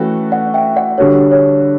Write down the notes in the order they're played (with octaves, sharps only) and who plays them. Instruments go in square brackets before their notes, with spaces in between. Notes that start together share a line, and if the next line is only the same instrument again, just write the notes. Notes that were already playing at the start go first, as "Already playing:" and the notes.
Already playing: [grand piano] E3 A3 C#4 F#4 A4 [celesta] E5 G5
[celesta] D5 F#5
E5 G5
D5 F#5
[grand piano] D3 G3 D4 F#4 A4 [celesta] C#5
[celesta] C#5